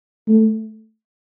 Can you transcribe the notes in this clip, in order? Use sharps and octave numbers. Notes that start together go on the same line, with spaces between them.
A3